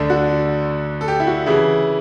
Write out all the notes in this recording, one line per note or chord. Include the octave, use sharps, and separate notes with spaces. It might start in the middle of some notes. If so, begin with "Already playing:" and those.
Already playing: D2 D3 D4
F#4
A4
G4
E4
F#4
C#3 E3 E4